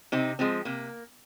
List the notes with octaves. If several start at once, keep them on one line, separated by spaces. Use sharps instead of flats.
C3 C4 D#4
F3 G#3 C4
C3 A#3